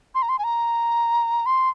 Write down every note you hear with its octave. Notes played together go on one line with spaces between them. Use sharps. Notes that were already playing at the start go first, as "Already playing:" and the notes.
C6
A#5
C6
G#5
A#5
C6